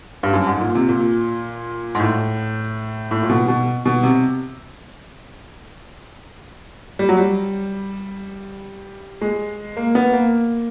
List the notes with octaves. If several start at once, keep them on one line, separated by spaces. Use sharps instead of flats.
G2
F#2
G#2
A#2
C3
A#2
G#2
A2
A2
A#2
B2
B2
B2
C3
G3
F#3
G3
G#3
A#3
B3
A#3